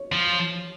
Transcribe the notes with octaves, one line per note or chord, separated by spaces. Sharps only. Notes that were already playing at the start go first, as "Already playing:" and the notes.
Already playing: C#5
F3